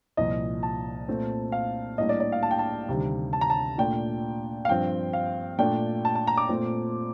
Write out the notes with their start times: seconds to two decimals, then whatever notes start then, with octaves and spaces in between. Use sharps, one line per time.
0.17 C2 A#2 F3 D#5
0.63 A5
1.08 A#2 A3 C4
1.52 F5
1.98 A2 G3 A#3 D4 D#5
2.09 D5
2.20 D5
2.32 F5
2.43 A5
2.51 G5
2.59 A5
2.89 D2 C3 D#3 G3
3.33 A5
3.41 A#5
3.50 A5
3.78 A#2 A3 D4 G5
4.65 F5
4.68 G2 F3 C4 G5
5.13 F5
5.59 A#2 A3 D4 G5
6.05 A5
6.15 A5
6.27 A#5
6.38 D6
6.49 A#2 A3 C4